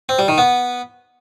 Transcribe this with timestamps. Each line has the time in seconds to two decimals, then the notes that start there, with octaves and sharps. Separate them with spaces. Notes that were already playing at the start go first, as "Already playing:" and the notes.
0.09 C4
0.19 G3
0.28 D#3
0.38 B3